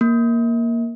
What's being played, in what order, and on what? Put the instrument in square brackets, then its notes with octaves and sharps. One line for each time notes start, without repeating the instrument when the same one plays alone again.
[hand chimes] A#3